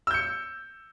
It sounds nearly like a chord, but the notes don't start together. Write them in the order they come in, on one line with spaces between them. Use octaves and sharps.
E6 G6 C#7